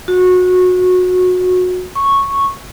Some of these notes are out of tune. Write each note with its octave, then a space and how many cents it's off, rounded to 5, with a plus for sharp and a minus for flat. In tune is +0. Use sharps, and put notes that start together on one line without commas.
F#4 -25
C#6 -5